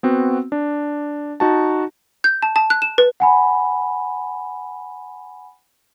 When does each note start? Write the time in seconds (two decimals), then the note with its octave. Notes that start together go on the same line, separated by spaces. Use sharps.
0.03 B3 C4 F#4
0.52 D4
1.40 D#4 F#4 A5
2.24 G6
2.42 A5
2.56 A5
2.70 F#6
2.82 E7
2.98 B4
3.20 F#5 G#5 B5